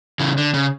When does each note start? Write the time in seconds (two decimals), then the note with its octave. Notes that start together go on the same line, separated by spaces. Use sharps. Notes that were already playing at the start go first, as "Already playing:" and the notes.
0.19 C#3 E3
0.38 D3
0.54 C#3